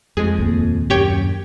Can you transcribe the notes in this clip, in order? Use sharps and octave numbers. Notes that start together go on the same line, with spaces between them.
F2 G#3 G#4
D#2 A#2
F#2 G4 C#5 G5